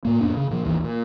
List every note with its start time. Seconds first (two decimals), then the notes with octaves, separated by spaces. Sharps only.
0.05 A2 A#3
0.21 F2 A#2 B3 D4
0.37 C#3
0.51 A#2 F3
0.65 G#1 D#2 E3
0.84 A#2